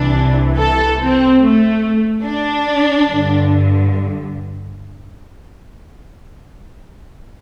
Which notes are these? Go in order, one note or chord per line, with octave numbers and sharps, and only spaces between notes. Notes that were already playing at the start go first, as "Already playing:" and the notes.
Already playing: C2 C3 E3 D4
A4
C4
A3
D4
G2 D3